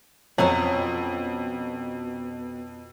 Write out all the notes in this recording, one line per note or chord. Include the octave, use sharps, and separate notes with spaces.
F2 B2 F#3 C4 C#4 F4